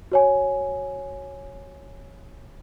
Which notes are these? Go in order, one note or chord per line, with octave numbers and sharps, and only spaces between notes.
F#4 C#5 G#5